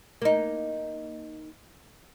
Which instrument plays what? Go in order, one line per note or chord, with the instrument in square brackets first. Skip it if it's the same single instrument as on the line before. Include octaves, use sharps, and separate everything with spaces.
[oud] A#3 D#4